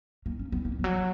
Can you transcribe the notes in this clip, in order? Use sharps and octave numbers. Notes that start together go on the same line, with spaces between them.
A#3
C#4
B3
A#3
F3
F#3